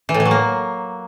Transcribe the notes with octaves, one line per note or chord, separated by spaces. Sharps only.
E3
A2
E3
F#3
A#3